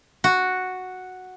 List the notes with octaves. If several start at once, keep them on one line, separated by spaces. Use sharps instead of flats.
F#4